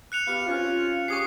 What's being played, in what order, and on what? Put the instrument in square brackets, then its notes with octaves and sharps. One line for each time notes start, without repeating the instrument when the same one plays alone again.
[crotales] F#6 C#7 F7
[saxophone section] B3 G4 F5
C4 C#4 F4
[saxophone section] C#4 G4 G#4 [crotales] C#6 D#6 C7